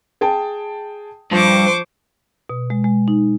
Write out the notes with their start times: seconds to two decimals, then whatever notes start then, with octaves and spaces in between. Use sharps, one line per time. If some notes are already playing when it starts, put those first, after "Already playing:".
0.21 G#4 G5 A5
1.32 G2 F3 C5 C#6 D6
2.50 B2
2.70 G#3
2.84 G#3
3.08 D#4